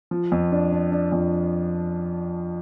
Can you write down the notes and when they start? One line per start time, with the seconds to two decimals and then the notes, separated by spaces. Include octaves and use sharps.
0.11 F3
0.32 F2
0.52 D4
0.72 D4
0.92 D4
1.12 F2